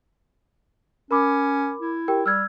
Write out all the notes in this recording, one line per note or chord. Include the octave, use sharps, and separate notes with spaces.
C#4 A#4 B5 D6
E4
G4 A#4 G5
G3 E6 F6 G#6